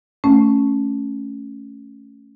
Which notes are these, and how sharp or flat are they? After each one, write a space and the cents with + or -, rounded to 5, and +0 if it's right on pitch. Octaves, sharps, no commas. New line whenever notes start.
A3 +0 C#4 +0